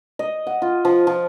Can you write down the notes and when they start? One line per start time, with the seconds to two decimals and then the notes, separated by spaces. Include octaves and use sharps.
0.19 D#5
0.47 F#5
0.62 F4
0.85 F3
1.07 F3